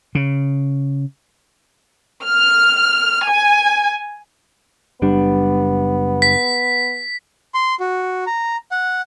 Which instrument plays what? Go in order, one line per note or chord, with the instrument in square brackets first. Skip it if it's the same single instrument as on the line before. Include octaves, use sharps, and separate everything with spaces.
[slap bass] C#3
[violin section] F6
G#5
[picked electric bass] F#1 G3 D4 [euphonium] B3
[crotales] B6
[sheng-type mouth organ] C6
F#4
A#5
F#5